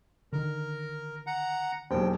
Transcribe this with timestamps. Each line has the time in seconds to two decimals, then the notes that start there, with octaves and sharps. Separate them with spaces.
0.33 D3 D#3 A#4
1.27 F#5 A#5
1.91 E1 D#2 F#3 C5 G5